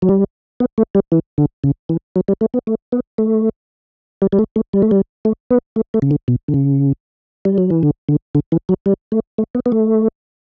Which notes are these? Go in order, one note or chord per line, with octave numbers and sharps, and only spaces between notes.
F#3
G3
B3
A3
G3
E3
D3
C#3
E3
F#3
G3
A3
B3
A3
B3
A3
G3
G3
A3
A3
G3
A3
G3
A3
B3
A3
A3
C#3
D3
B2
D3
C#3
G3
F#3
E3
D3
D3
D3
E3
F#3
G3
A3
A3
B3
B3
A3